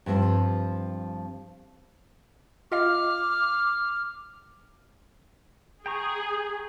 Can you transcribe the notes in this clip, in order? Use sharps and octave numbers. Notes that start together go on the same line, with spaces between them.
G2 F3 C4
F4 D#5 F5 D6 F6
G#4 G5 A#5 C#6